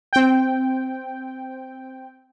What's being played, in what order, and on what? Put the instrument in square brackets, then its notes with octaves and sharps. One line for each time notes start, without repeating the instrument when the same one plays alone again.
[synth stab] C4 G5